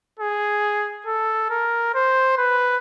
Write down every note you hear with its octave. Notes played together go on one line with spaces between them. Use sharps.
G#4
A4
A#4
C5
B4